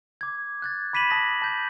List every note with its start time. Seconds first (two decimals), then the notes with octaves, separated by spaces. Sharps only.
0.21 D6 G#6
0.62 F#6 G#6 A6
0.93 B5 D6 B6 D#7 E7 F#7
1.10 A5 D#6 A#6
1.42 A5 G6